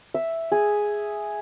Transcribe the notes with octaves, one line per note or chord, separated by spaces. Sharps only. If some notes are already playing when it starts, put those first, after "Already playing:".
E5
G#4